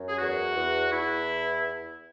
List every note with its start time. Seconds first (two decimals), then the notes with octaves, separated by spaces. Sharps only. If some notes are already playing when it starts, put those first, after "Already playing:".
Already playing: F#2
0.09 G#4
0.19 E2 F#4
0.55 E2
0.91 E2 E4